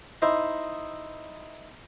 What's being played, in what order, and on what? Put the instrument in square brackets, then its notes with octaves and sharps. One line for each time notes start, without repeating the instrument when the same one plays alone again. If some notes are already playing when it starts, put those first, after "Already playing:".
[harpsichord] D#4 E4 C5 D#5